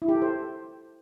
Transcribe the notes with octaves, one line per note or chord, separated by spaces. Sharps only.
E4
G4
A4
C5